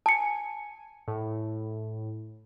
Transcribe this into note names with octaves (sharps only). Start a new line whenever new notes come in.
G#5 A5 C#7
A2